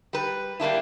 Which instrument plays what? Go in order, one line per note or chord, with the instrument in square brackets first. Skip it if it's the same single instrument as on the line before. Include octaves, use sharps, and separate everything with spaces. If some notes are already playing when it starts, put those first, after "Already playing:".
[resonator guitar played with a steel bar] G3 B4
G3 A#3 D4 E4